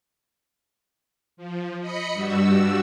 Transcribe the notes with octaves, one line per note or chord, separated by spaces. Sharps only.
F3
D#5 B5 C#7
G2 G3 F#4 E6